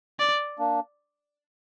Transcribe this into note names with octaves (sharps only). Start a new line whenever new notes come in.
D5
A#3 D4